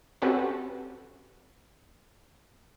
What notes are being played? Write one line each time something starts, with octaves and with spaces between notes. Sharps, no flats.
C4 C#4 F#4 G4 A4 B4